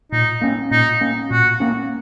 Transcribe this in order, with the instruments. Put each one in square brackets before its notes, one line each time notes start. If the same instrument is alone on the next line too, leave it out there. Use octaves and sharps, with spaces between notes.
[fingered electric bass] A#2 [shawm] D#4
[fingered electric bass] A#3 C#4
[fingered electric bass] A#2 [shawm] D#4
[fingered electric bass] A#3 C#4
[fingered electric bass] A#2 [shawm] F#4
[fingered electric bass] A#3 C#4